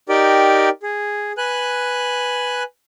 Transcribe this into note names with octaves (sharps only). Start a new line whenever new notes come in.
D#4 G4 A#4 D5 G5
G#4
B4 G#5 F#6